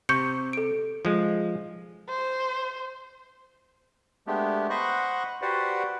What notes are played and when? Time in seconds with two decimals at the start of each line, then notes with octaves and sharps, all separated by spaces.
0.09 C3 C#6 G6 C#7
0.53 A4 D7
1.05 F3 G#3
2.10 C5
4.27 G#3 A3 B3 D4 G4
4.70 C5 D#5 F#5 B5 C#6 F#6
5.42 F#4 G4 B4 C5 D5 F#5